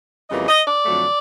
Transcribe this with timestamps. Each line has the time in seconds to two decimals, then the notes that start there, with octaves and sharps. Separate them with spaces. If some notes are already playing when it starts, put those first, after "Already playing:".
0.29 F2 C#3 E3 G3 A#3 D#5
0.48 D#5
0.67 D5
0.85 F2 D3 F#3 A3